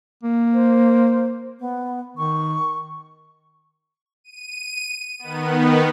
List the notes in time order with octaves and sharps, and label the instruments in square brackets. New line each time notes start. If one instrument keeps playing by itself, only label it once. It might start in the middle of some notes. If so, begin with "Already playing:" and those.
[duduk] A#3
[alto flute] C5
B3
[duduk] D#3 [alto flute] C#6
[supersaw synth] D#7
D#3 B3